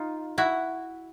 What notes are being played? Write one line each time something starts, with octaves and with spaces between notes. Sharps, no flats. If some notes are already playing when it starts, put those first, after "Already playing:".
Already playing: D#4 F4
E4 F#4